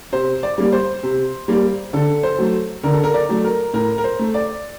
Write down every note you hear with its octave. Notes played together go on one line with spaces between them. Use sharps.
C3 C5
D5
G3 A#3
C5
C3
G3 A#3
D3 A4
C5
F#3 A3
D3 A#4
A4
A#4
D5
F#3 A3
A#4
A2 A#4
A#4
C5
A3
D5